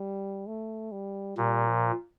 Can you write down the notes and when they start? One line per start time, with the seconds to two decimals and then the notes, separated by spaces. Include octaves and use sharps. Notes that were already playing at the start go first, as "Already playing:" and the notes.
Already playing: G3
0.47 A3
0.92 G3
1.37 A#2 G3
1.67 F3